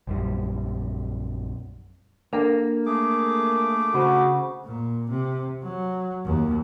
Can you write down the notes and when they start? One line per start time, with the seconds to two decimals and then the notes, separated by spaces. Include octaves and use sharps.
0.07 A#1 F#2 G3
2.33 A#3 D4 A4 A#4
2.86 A3 G#4 D6
3.94 C#3 F#4 C5
4.65 A#2
5.10 C3
5.63 F#3
6.25 D#2